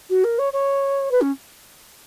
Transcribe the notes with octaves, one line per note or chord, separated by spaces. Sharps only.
F#4
A#4
C#5
C#5
B4
C#4